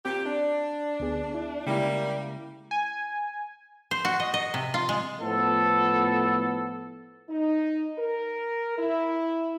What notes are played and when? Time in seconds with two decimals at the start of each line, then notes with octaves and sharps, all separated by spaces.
0.05 A#2 C4 G4
0.26 D4 D5
1.00 D2 B3 G#4
1.34 E4
1.67 C#3 G3 G#3 A#3 E4
2.71 G#5
3.91 C5
4.05 F#4
4.20 D#5
4.34 D#5
4.54 C3
4.74 F4
4.89 G#3
5.21 A2 F3 B3 A4
7.30 D#4
7.98 A#4
8.78 E4